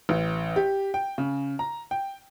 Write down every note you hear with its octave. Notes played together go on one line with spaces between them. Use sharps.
A1
G4
G5
C#3
A#5
G5